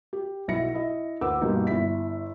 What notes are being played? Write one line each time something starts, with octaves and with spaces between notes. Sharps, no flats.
G4
B1 B2 E4 A#6 C#7
E4 D#5
D2 A#4 B4 F#5 D6 E6
G2 B2 F3 G3 A#3 D#4
G1 E4 B6